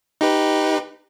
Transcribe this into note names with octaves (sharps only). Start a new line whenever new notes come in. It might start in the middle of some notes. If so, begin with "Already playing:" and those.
D#4 G4 B4